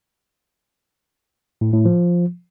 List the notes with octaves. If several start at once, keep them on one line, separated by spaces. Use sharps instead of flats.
A2
A2
F3